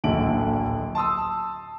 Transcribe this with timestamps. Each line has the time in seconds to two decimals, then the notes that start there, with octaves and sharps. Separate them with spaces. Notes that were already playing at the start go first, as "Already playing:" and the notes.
0.04 D1 A#1 D3 E5 D7 F#7
0.95 A5 C6 D#6 E6